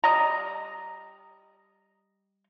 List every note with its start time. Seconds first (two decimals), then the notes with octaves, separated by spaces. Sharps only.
0.04 G3 D#5 A#5